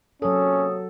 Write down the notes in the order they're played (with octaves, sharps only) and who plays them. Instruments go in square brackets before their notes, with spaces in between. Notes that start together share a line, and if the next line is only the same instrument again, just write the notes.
[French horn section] C3 A#3 C#5 [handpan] F#3 A4 [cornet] C#4 [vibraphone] D#6